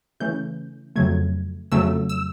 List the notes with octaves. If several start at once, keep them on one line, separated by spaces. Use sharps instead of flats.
C#3 E3 A3 C#4 G6
F2 C#3 F#3 A3 G#6
F2 C#3 F#3 A3 E6
E6